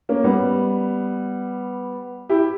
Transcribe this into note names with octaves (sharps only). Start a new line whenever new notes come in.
A#3 C#4
G3 B3
E4 G4